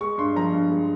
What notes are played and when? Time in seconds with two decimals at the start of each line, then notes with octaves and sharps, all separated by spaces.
0.01 G#3 C#6
0.18 G2 C6
0.36 F3 A#5
0.53 G2
0.71 G#3